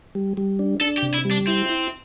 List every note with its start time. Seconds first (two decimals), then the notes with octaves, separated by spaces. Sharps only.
0.15 G3
0.37 G3
0.59 D4
0.81 D4 A4
0.98 G4
1.03 C3
1.14 E4
1.25 G3
1.31 D4
1.47 C4 E4
1.70 E4